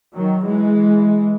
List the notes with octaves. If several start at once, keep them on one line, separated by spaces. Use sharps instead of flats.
D#3 F#3
E3 G#3